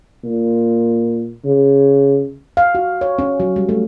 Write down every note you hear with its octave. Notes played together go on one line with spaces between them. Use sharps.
A#2
C#3
F5
F#4
C#5
C#4
F#3
G3
A3